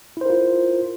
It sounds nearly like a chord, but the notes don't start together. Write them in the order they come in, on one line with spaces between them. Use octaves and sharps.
E4 C5 A#4 F4